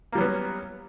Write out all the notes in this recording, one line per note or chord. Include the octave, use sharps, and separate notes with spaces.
F#3 G3 A#3 B3 C#4